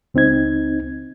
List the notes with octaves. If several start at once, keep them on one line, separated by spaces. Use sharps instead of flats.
C#2 C4 D#4 G#6